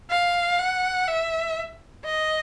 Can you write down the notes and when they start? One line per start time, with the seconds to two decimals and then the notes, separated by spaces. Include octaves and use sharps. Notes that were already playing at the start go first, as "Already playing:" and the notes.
0.11 F5
0.59 F#5
1.08 E5
2.05 D#5